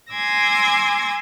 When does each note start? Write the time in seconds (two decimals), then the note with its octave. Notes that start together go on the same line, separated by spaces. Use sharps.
0.12 G#5 C6 D6 E6 G#6 A#6